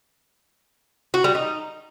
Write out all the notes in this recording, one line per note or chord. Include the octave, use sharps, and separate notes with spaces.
F#4
G3
D#4